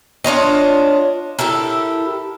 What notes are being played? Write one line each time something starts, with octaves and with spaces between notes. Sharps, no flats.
D4 F4 C#5 D#5
E4 G4 A4 A#4